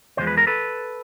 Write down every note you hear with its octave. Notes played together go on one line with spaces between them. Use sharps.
E2 C#3 F3 G#3 C5
B4
A#4
A4 B4